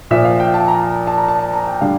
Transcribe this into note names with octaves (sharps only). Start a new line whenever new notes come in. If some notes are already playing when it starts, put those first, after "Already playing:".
A#2 F3 E5
F5
G5
A5
A#5
A5
A#5
A5
A5
A#5
G5
D3 G3 F5